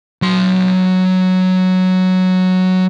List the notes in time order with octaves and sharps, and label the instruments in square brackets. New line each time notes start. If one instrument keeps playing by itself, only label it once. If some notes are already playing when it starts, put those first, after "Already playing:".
[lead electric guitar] F#3 C6